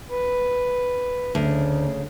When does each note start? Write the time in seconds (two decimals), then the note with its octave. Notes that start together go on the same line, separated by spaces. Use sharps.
0.10 B4
1.35 D2 C#3